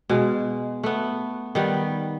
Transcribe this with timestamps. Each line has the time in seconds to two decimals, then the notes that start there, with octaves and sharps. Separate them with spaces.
0.09 B2 G#3
0.83 A3 B3
1.55 D#3 G3 B3